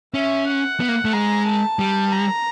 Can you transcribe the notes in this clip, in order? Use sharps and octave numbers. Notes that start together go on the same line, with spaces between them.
C#4 E5
F#5
B3
A#3
A3
G#3 A#5
A5
G3
A#5